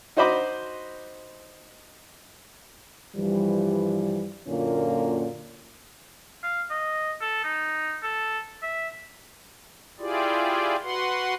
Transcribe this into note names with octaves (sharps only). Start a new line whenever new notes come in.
D#4 F#4 C5 D#5 B5 D6
G2 E3 F3 G3
F#2 A#2 D3 A#3 C#4 F4
F5
D#5
A4
D#4
A4
E5
E4 F4 G4 G#4 D5
F#4 B4 F#5 C6